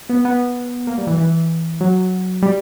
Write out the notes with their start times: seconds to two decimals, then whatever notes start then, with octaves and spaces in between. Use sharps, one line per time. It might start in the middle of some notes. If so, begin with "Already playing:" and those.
0.09 B3
0.25 B3
0.87 A#3
0.98 G3
1.07 E3
1.18 E3
1.81 F#3
2.43 G3